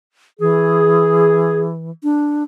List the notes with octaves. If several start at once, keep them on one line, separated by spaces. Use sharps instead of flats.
E3 G#4
D4